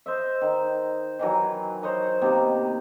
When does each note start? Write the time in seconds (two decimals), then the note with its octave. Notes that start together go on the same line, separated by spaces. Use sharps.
0.06 C5 D#5 E5
0.41 D#3
1.19 D#3 E3 F#3
1.83 C5 C#5 D#5 A#5
2.22 C3 D#3 A#3 B3